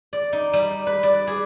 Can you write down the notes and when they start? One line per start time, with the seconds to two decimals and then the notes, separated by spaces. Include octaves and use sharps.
0.13 D5
0.33 D#4
0.53 G3
0.87 B4
1.03 D5
1.27 G#4